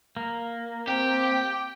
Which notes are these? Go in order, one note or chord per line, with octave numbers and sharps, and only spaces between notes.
A#3
C4 G4 G5